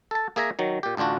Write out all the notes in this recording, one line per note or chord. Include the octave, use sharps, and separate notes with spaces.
A4 A5
A#3 G#4 E5 G#5 A#5
D#3 F#3
A#2 G4
A1 D2 D4 F4 F#4